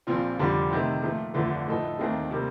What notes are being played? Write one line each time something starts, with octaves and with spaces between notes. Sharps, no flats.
A#1 A#2 F3 C4 F4
F1 F2 D3 G3 D4
C3 D#3 A3
A#2 F3 A3
G1 F2 D3 A3
A2 F3 A3 D#4 A4
D#2 D#3 A3 C4
C3 G3 A#3